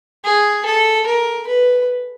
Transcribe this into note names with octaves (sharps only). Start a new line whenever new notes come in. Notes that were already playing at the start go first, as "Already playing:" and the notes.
G#4
A4
A#4
B4